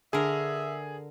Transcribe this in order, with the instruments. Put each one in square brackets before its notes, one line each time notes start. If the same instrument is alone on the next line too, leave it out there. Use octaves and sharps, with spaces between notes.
[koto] D3 A#4 [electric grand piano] G#4 [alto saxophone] E5